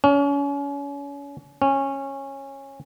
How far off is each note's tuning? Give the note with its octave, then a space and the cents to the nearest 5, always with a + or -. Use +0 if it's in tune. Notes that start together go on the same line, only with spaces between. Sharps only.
C#4 +35
C#4 -15